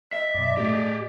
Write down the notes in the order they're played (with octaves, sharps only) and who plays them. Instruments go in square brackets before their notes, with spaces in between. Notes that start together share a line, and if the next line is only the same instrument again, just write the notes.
[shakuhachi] D#5 [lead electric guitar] E5
[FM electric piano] F#2 B2 [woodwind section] D5
[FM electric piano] A2 A3 [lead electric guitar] G4 G#4